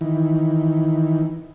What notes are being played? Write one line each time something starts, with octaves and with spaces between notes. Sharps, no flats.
D#3 E3